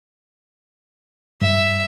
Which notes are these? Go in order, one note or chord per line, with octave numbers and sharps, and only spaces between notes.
G2 E5